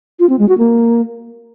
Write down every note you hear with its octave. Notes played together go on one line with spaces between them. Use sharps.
F4
C4
G#3
F#4
A#3